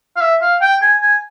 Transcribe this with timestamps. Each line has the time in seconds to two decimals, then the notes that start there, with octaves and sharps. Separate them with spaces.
0.16 F5
0.21 E5
0.41 F5
0.62 G5
0.82 G#5
1.02 G#5